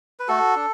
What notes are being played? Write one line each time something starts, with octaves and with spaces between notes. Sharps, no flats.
B4
A3 F#4 A4
D4